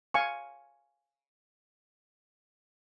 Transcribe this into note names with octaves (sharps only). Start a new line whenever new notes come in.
F5 G#5 C#6